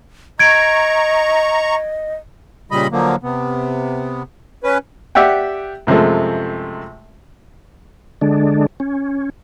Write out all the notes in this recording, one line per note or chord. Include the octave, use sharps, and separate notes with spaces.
D#5 A#5 C#6 G#6 D7
A#2 C#3 G3 D#5 B5
D3 F3 F#3 A#3
C3 B3
C#4 B4
G4 D5 E5 F#5 G5
F#2 C3 F3 G#3 A3
D3 G#3 D4
C#4